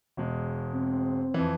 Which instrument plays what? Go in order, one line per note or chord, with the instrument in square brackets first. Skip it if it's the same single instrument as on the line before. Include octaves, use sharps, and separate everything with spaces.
[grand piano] E1 G#3
[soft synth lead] C4
[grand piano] F2 E3